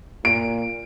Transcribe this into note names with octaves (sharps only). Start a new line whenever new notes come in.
A#2 D7